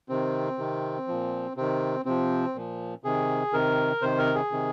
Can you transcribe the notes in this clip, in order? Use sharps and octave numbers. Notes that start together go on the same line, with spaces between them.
C3 D#3 C4
C3 D#3
A#2 F3
C3 D#3 C4
C3 F3 C4
A#2 F3
C3 D#3 G#4
C3 D#3 A#4
C3 D#3 C5
A#4
G#4
C3 D#3